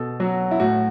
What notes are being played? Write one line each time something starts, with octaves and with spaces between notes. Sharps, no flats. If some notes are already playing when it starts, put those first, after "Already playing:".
Already playing: B2 A4
F#3 F#4
E4
A2 F#4